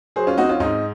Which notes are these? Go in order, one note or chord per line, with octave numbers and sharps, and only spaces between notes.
F#3 G#4 C5
C#4 F4
C4 D#4 F#4
C#4 F4
G#2 D#4